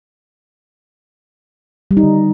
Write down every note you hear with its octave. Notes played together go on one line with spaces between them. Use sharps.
G3
D#4
D3